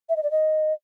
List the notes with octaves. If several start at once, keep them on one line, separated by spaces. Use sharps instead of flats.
E5
D#5
D5
D#5